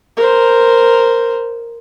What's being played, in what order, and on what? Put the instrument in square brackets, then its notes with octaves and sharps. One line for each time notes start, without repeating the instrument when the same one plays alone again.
[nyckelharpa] A#4 C5